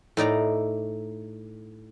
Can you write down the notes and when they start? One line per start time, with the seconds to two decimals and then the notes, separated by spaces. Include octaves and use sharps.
0.17 A2 D#4 D5 A#5